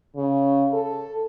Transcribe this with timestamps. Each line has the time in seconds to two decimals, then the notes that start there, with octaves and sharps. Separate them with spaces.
0.16 C#3
0.73 A4